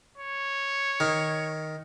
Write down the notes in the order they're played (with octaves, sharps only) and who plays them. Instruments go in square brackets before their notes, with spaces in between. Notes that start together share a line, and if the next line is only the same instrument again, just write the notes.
[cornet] C#5
[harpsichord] D#3